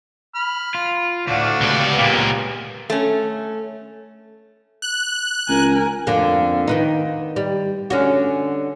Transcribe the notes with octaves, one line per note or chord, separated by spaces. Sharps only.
B5 F6
F4
D2 A2 A3 D4 F#4 F5 D6
C#2 B3 G4 D5 F5
C#2 A#2 A#3
A3 C#4
F#6
C#2 A#4 G#5
F2 D3 A#3
D#3 B3 D#4
G3
D3 C#4 F#4